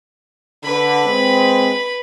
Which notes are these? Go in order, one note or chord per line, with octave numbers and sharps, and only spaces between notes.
D3 B4 B5
G#3 C4